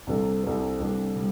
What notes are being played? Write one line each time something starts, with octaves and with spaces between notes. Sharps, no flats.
C2 C3 G3 D4 A4
C2 C3 G3 D4 A4
C2 C3 G3 D4 A4
C3 G3